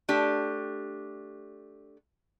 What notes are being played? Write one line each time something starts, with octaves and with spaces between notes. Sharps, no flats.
A3 D4 G4